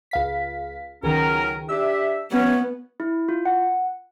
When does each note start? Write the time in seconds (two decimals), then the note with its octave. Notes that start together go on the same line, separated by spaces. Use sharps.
0.11 C#2 F5 B6
1.03 C#2 D#3 F#3 C#4 A#4
1.69 D4 G4 E5 E6
2.31 F#3 A3 B3 C#4
3.00 E4
3.29 F4
3.45 F#5